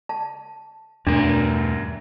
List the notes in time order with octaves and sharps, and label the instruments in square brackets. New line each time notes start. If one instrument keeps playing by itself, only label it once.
[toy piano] A5
[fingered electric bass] E2 B2 A3 [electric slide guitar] G2 A#4 [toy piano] D4